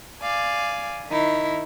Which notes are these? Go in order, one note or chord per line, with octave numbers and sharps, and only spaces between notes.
D5 F5 G#5
D#3 D#4 E4